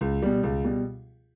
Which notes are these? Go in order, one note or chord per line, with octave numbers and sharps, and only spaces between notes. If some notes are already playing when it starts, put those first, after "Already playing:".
C#2
B2 G3
C#2
B2 G3